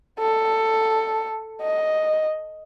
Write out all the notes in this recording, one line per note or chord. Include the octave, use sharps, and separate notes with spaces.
A4
D#5